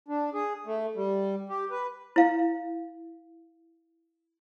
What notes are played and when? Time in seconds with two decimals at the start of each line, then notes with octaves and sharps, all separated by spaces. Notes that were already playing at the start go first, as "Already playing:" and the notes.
0.08 D4
0.33 G#4
0.65 A3
0.96 G3
1.49 G4
1.71 B4
2.16 E4 F5